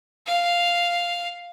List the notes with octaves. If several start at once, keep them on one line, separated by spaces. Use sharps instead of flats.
F5